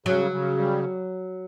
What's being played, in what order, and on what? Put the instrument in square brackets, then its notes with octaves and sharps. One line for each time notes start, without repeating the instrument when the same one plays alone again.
[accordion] C#3 [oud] F#3
[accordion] C#3
G3